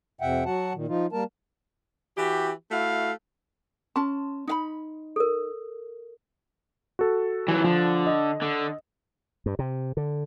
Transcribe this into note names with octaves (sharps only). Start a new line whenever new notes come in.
F2 C3 E5 F#5 G5
F#3 F#4 F#5 A5
A#2 D#3
F3 D#4 F4
G3 A#3 A#4 A5
E3 F#4 G4
A3 E4 F#4 F5
C#4 A5 C6
D#4 F5 B5
A4 A#4
F#4 A4
E3 F#3
D3 F3
D#5
D3
G2
C3
D3